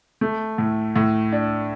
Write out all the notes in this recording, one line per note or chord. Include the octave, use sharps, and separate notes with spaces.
A3
A2
A2
D4